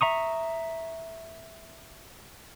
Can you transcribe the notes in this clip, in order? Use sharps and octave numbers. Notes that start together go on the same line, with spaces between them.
E5 A#5 C#6 D#6